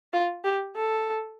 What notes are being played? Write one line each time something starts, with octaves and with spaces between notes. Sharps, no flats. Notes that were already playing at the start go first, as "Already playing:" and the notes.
F4
G4
A4